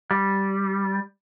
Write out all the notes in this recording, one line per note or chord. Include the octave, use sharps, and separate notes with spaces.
G3